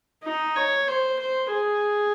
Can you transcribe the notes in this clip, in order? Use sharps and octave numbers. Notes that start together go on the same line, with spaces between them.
D#4
C#5
C5
C5
G#4